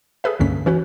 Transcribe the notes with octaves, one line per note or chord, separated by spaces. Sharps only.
G#4 A4 B4 E5
C#2 G2 D3 A#3 C#4 B6
E3 C#4 F#4 B4